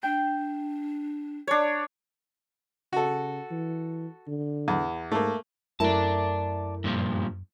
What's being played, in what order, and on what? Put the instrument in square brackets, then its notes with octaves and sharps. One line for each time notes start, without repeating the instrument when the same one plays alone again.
[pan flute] D4 [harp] G5
[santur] D4 C#5
[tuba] C#3 [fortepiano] F#4 A4
[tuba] E3
D3
[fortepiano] E2
[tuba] G#2 [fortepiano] A3 A#3
[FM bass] F#2 [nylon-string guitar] A3 E4 A#4 [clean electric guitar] D5 A5
[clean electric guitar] G2 A#2 F3